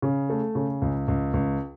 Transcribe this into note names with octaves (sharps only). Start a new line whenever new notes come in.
C#3
A3
C#3
C#2
C#2
C#2